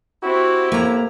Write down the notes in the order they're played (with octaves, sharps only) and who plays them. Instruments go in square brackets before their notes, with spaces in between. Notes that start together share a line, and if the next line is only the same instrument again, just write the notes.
[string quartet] C4 G4 [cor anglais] E4 [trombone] F#4
[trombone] A2 [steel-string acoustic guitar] A#3 A#5